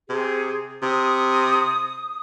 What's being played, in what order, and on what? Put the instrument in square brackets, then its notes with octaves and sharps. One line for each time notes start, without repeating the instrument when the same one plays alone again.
[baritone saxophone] C3 [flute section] G#4
[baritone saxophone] C3 [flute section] D#6